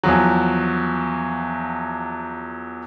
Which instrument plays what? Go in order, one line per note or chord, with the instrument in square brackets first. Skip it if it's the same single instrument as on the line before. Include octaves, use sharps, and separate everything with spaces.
[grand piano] E2 F3 F#3